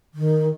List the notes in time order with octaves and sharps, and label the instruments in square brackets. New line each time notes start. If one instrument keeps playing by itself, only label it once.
[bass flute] D#3